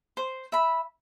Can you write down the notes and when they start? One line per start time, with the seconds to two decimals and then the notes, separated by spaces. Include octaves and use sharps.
0.17 C5
0.52 E5 B5